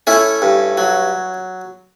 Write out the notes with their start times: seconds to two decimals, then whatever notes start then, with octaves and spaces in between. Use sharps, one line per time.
0.07 A3 C#4 E4
0.42 G2
0.78 F#3